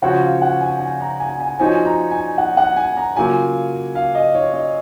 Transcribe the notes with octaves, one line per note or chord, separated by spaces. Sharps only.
C#3 F3 C4 F#4 C#5 F#5
F5
F#5
G#5
G#5
A#5
G#5
G#5
F3 C4 D#4 F#4 C#5 G#5
G#5
A#5
G#5
F#5
F#5
G#5
A#5
C#3 F#3 A#3 F4 G#5
F5
D#5
C#5
D#5